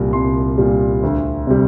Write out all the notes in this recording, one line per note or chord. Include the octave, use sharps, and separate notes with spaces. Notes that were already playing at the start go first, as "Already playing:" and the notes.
Already playing: C2 A#2 G3
C2 C6
A#2 G3
D2
C3 G3